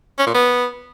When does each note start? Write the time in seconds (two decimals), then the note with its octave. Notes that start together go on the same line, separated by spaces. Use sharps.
0.19 C#4
0.26 A#2
0.34 B3